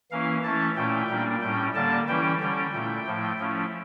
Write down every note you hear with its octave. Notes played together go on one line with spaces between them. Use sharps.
E3 A#3 C#4 E4 F5
E3 A3 C#4 E4 A5
A#2 A3 C#4 E4 G5
A#2 G3 A#3 D4
A2 G3 C#4 G5
D3 G3 A#3 A5
E3 G3 C#4 E4 G5
D3 G3 C#4 G5
A#2 A3 E4 G5
A2 F3 A3 E4
F3 A3 C#4 E4